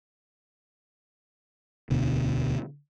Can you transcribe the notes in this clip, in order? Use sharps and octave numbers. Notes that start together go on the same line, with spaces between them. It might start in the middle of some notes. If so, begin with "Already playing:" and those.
E1 D2 B2 D3